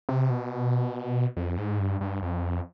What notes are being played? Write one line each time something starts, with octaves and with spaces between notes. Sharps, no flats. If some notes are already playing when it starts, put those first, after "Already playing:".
C3
B2
F2
G#2
G2
G2
F2